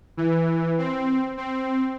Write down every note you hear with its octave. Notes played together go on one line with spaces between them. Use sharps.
E3
C4
C4